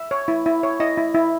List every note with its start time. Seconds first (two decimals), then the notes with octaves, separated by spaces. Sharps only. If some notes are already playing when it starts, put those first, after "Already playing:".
Already playing: E5
0.11 C#5
0.28 E4
0.46 E4
0.63 C#5
0.80 E4 D#5
0.98 E4
1.15 E4